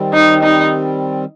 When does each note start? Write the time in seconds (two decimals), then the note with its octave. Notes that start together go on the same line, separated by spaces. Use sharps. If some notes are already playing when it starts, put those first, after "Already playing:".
Already playing: D#3 G3 C4
0.13 D#4
0.43 D#4